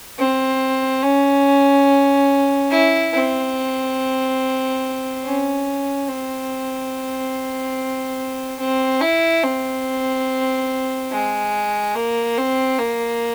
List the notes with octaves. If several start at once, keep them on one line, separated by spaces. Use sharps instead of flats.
C4
C#4
E4
C4
C#4
C4
C4
E4
C4
G#3
A#3
C4
A#3